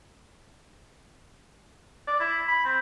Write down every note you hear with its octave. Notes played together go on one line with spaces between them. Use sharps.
D5
E4
B5
C4